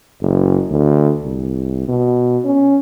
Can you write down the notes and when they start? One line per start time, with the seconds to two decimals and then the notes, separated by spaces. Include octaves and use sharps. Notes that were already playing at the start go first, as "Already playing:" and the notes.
0.22 F#1
0.70 D2
1.24 C2
1.88 B2
2.45 C#4